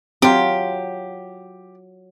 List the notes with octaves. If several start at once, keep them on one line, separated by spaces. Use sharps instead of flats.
F#3 C4 F4 G4